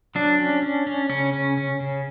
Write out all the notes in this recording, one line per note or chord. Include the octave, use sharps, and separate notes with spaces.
F#3 D4
C#4
C#4
C#4
C#3 C#4
C#4
C#4
C#3